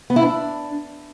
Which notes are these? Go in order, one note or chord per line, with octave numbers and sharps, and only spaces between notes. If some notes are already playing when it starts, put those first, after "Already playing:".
B3
E4
D4